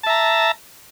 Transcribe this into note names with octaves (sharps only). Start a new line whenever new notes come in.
E5 A5 A#5